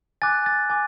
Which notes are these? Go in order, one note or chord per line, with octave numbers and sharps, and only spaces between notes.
G#5 D6 F#6 A6
A6
G#5 D6